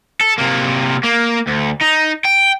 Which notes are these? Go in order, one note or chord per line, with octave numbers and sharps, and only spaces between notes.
A4
C3 A#3
A#3
D2
D#4
G5